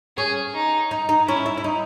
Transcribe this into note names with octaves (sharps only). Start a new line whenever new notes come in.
C#4 G#4
D#4
D#4
D#4
C#4 E4
E4
E4
D#4